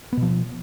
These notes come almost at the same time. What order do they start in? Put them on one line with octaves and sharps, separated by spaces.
B3 B2 F3